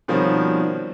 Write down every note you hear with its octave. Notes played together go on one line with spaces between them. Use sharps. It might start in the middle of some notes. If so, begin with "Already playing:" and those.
B2 D#3 F3 G3 C4 C#4